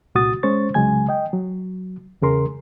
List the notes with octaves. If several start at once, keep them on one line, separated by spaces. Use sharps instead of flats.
C2 A#2 F#4 D#6 A6
G#3 C#4 C5 C#6 A6
C2 C#3 F#3 G#3 G#5 G#6
D#5 G5
F#3
E2 C#3 G#4 A#4 C6